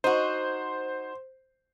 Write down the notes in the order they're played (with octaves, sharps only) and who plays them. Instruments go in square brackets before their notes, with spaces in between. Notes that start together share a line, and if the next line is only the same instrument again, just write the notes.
[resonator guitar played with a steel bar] D#4 F#4 [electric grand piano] C5